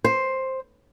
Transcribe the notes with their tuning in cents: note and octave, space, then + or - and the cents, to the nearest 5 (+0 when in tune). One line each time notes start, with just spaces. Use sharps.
C5 +10